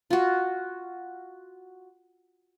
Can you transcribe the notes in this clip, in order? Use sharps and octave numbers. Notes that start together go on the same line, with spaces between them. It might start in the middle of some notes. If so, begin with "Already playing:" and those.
F4 F#4